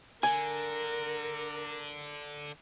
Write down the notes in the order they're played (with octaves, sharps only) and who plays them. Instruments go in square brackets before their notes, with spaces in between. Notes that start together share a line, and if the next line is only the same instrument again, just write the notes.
[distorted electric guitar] D3 [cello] A#4 [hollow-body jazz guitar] G#5